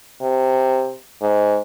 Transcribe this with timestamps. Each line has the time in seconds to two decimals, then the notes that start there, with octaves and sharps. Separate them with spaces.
0.21 C3
1.22 G#2